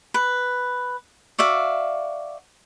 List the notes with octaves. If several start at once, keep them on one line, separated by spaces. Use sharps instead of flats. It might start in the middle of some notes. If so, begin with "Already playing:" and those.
B4
F#4 D5 E5 F5